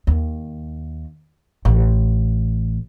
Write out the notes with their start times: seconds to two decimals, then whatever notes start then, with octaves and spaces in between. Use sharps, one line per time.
0.07 D#2
1.65 A1